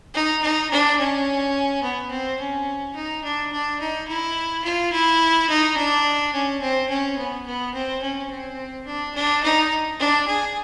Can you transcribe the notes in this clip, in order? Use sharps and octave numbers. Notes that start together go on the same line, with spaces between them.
D#4
D#4
D4
C#4
B3
C4
C#4
D#4
D4
D4
D#4
E4
F4
E4
D#4
D4
C#4
C4
C#4
B3
B3
C4
C#4
C4
D4
D4
D#4
D4
G#4